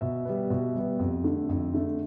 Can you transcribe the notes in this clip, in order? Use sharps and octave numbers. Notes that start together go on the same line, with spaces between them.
B2 E5
G3 B3
B2 E5
G3 B3
F2
D3 A3
F2
D3 A3